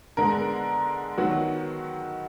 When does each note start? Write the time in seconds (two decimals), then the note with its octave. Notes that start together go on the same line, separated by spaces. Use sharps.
0.17 D3 G#3 B3 A#4
1.18 D#3 F#3 B3 F#4